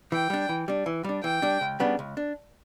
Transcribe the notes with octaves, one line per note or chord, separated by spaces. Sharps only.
E3 G5
G3 D4
E3
G3 D4
E3
G3 D4
E3 G5
G3 D4
C#2
C#3 G3 B3 D4
C#2
D4